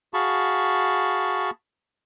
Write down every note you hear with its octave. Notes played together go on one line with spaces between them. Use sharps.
F#4 G#4 F5 A5 B5 C#6